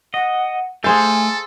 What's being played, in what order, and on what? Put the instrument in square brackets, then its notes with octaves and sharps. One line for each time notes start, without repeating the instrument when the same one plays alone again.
[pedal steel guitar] D#5 [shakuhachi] F#5
[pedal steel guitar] A3 G6 [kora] G#4 C5 F5 [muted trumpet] A4 [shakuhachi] G#5